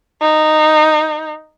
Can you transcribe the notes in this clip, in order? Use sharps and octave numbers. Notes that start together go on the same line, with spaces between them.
D#4